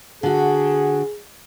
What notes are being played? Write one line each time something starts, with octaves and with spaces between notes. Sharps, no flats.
D3 F#4 G#4